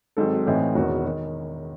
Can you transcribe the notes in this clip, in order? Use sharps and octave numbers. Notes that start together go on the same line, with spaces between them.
G#1 G#2 F#3 C4 A4
A1 A2 E3 C4 D#4
E1 E2 D#3 F#4
D#3